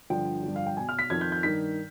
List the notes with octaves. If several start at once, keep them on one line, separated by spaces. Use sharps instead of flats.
G2 D3 F3 G5
G2 D3 F3
F5
G5
B2 G#5
F6
B6
F2 D#3 G#6
G6
G6
G2 D#3 B6